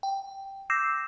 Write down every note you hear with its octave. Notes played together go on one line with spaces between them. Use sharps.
G5
D6 E6 G6 A#6 C7 E7